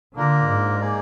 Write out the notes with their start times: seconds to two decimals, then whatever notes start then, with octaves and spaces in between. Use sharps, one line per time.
0.15 D3 A#3 D4 F4 A#4
0.48 G#2
0.80 A#3 D#4 G#4 D5